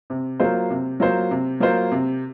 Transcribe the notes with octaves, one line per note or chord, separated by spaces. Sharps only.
C3
F#3 A#3 F4 C5
C3
F#3 A#3 F4 C5
C3
F#3 A#3 F4 C5
C3